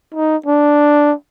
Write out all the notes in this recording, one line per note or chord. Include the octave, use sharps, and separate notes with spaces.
D#4
D4